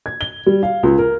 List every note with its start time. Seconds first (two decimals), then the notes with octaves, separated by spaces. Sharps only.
0.06 G#6
0.21 G7
0.46 G3
0.63 F5
0.83 C#2
0.98 A#4